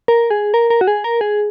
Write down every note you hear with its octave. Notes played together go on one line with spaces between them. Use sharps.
A#4
G#4
A#4
A#4
F#4
G#4
A#4
G#4